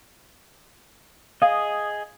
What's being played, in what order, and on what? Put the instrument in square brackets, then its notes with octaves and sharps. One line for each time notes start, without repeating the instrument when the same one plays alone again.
[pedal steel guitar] G#4 D#5 [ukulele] F5